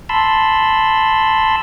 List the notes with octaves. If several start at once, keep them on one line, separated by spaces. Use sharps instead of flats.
A5 B5 C6 E6